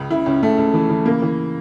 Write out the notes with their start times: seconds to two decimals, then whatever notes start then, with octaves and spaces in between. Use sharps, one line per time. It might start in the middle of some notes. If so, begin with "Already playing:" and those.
Already playing: C#2 C#3
0.10 C#3 E4
0.26 C#2 C#4
0.42 C#2 A3
0.58 C#2
0.74 E3
0.89 E3
1.06 C#3 A#3
1.22 E3